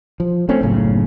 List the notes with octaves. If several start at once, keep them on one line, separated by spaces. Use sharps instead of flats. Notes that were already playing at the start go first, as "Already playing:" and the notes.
F3
A3 C4 C#4
F#1 B1 A2 C#3